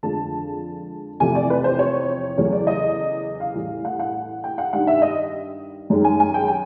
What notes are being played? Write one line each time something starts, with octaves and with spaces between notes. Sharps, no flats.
F2 D3 F3 G#3 A5
E2 C3 F3 A3 G#5
D5
B4
C5
C#5
E2 C#3 F#3 A3 C#5
D5
D#5
F5
A2 E3 G3
F#5
F#5
G5
F#5
G2 D#3 G3 F#5
E5
D#5
F#2 D#3 G#3
G#5
G#5
G5
G#5